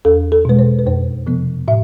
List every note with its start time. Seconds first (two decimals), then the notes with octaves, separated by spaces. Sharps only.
0.05 E2 A4
0.32 A4
0.45 B2 G#3 B4
0.59 C5
0.79 B4
0.87 F2 C5
1.27 C3 F3 B3
1.68 A2 E5